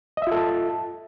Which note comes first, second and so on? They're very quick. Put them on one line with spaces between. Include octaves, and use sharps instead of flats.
D#5 E5 F4 A4 A5